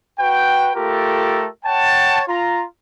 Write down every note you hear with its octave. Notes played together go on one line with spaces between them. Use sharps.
F#4 B4 G5
A3 F4 G4 A4 A#4
C#5 F#5 G5 A5
F4 A#5